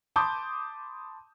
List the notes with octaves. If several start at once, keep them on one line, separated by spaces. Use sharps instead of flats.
A5 B5 C6 D6 D#6 G6